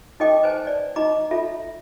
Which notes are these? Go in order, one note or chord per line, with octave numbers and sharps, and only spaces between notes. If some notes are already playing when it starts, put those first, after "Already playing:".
D#4 A4 D#5 G5 D6
B4 C5 G#5 A5
D5
D#4 D#5 A#5 D6
F4 A4 E5